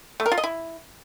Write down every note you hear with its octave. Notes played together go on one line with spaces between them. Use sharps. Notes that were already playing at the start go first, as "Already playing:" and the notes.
A3
A#4
F4
D#5
E4